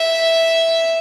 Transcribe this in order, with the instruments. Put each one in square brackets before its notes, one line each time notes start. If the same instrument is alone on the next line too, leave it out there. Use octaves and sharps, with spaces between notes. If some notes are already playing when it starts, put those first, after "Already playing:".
Already playing: [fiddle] E5